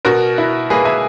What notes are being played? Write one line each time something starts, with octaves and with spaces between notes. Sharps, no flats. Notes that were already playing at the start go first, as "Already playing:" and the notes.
B2 F#4 A#4
E4
A#3 G#4 B4
E5 G#5